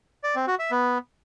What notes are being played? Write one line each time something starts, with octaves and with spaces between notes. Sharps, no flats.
D5
C4
F#4
E5
B3